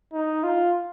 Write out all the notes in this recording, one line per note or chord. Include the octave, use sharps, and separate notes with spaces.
D#4
F4